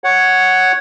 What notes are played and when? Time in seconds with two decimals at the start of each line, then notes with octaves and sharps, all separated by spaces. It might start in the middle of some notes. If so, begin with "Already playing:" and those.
0.04 C#5 F#5